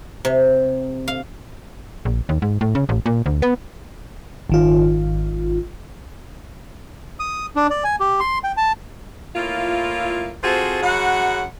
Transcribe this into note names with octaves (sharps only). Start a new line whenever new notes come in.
C3
F5
A#1
D#2
G#2
A2
C#3
A1
A#2
D2
B3
G#1 D#3 F4
D#6
D4
D5
G#5
G4
C6
G5
A5
A2 A#3 E4 F4
C4 F4 F#4 G#4 A4 C5
F#2 C#3 F#4 F#5